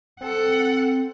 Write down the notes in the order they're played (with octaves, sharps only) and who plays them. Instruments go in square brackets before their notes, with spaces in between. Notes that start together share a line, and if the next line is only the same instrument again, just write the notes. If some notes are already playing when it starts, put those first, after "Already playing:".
[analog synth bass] C4 [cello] A4 F#5